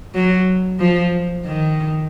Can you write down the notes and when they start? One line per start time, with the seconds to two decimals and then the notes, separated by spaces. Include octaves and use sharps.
0.15 F#3
0.80 F3
1.45 D#3